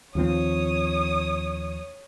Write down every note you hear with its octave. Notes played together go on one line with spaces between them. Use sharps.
D#2 F3 C4 C#5 D#6